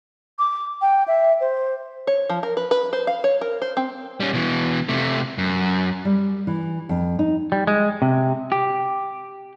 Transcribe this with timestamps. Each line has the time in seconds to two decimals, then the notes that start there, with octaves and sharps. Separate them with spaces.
0.39 D6
0.81 G5
1.07 E5
1.41 C5
2.07 C#5
2.29 F3
2.43 A#4
2.57 B4
2.71 B4
2.93 C5
3.07 F5
3.24 C#5
3.41 A#4
3.62 C5
3.77 C4
4.20 G3 C#4
4.33 B2 E3
4.89 C3 A3
5.38 F#2
6.05 G3
6.47 E3
6.89 F2
7.19 D#4
7.52 G3
7.67 G#3
8.02 C3
8.52 G4